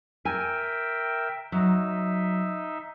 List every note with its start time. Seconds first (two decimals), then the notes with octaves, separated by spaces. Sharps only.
0.25 A#4 E5 G5 G#5
1.52 F#3 D#4 E5